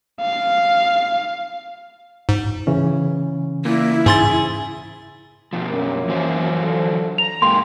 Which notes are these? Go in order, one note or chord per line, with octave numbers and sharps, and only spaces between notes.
F5
G#2
C#3 E3 C#4
A#2 A#3 E4
G#2 G#4 C6 A6
B2 F3
F#2 A#3
E3 F#3 C5
D3 F3
A#5 F7
G#2 A#3 G4 C6